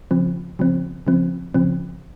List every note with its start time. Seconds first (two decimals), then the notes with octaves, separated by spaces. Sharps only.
0.11 C#3 F3 C4
0.59 C#3 F3 C4
1.07 C#3 F3 C4
1.54 C#3 F3 C4